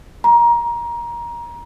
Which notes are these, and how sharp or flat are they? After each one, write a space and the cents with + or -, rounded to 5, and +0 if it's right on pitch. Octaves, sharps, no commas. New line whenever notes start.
A#5 +20